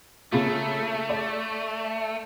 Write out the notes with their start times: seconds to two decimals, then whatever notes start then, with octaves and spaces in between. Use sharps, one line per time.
0.32 C#3 A3 A#3 F4
1.10 D5